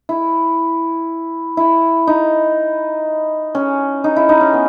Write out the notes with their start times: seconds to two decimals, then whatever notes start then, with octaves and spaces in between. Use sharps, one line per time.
0.09 E4
1.57 E4
2.07 D#4
3.55 C#4
4.04 D#4
4.16 E4
4.29 D#4
4.41 C#4
4.53 B3